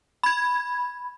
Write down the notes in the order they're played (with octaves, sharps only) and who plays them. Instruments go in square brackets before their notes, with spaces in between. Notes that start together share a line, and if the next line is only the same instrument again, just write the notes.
[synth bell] B5 G#6